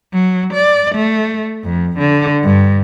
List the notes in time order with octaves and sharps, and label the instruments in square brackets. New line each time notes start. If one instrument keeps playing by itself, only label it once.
[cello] F#3
D5
A3
F2
D3
G2